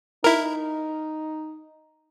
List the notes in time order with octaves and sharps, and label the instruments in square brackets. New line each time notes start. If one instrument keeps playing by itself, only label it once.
[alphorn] D#4 [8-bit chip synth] E4 A#4